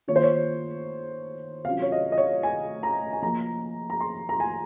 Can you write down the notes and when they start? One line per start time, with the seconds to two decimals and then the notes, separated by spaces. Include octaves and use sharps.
0.08 D#3 A#3 F4 C#5
0.16 C5
0.24 C#5
1.65 C3 F#3 C#4 F4 F5
1.82 C#5
1.92 D#5
2.12 D#5
2.18 C#5
2.43 G#5
2.83 A#5
3.13 G#5
3.22 F3 A#3 F4 A#5
3.90 A#5
4.01 C6
4.29 A#5
4.40 G#5